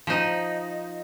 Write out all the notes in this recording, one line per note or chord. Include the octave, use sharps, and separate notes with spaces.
F3 D#4